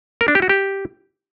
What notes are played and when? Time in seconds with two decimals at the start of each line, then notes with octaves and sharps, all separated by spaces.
0.21 A#4
0.28 D4
0.35 G4
0.42 F#4
0.49 G4